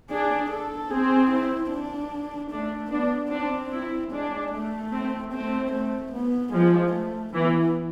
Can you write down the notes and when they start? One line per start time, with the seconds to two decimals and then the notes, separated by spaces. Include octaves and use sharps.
0.10 D4 G#4
0.51 A4
0.91 C4 G#4
1.31 E4
1.72 D4
2.51 A3 D4
2.92 B3 D4
3.32 C4 D4
3.72 E4
4.12 G#3 D4
4.52 A3
4.92 C4
5.33 A3 C4
5.73 A3
6.13 B3
6.53 F3 G#3
6.93 A3
7.34 E3 B3